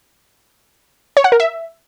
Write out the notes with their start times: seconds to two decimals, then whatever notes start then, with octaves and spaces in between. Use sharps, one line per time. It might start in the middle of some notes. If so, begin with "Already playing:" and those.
1.17 C#5
1.24 F#5
1.32 A#4
1.40 E5